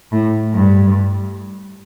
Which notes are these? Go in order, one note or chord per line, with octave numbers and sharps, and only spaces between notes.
A2
G2